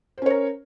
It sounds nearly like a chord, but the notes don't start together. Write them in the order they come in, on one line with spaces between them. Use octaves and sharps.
C5 C#4 C#5 A#4